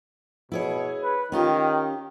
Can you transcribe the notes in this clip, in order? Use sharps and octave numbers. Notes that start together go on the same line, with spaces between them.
B2 E4 G#4 C#5
B4
D#3 C#4 F4 G4